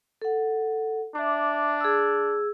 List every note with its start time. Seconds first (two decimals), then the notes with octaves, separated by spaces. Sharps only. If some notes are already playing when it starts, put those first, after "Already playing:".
0.22 A4 F#5
1.15 D4 E5 D6
1.81 G#4 E6